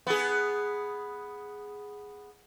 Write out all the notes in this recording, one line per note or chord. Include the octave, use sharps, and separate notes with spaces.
B3 G#4